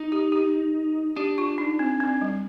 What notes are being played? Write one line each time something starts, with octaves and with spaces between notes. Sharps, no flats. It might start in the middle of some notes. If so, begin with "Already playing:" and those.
Already playing: D#4
G4
G4
D4 G4
F4
D#4
C4
C4
G3